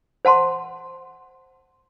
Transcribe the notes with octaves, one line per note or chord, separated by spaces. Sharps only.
C5 F#5 A5 C6